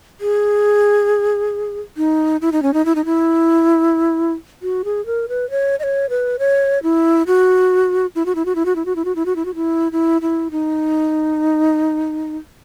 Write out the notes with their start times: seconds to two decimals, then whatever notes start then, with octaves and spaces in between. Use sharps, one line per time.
0.21 G#4
1.97 D#4
2.41 E4
2.52 D#4
2.63 C#4
2.74 D#4
2.85 E4
2.95 D#4
3.05 E4
4.62 F#4
4.85 G#4
5.06 A#4
5.29 B4
5.50 C#5
5.79 D#5
5.83 C#5
6.10 B4
6.39 C#5
6.83 E4
7.27 F#4
8.15 E4
8.26 F#4
8.35 E4
8.45 F#4
8.55 E4
8.66 F#4
8.76 E4
8.86 F#4
8.96 E4
9.05 F#4
9.16 E4
9.26 F#4
9.36 E4
9.45 F#4
9.55 E4
9.92 E4
10.22 E4
10.51 D#4